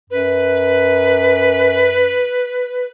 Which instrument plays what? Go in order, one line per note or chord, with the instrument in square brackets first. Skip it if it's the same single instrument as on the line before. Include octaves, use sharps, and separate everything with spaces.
[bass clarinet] F#2 [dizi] B4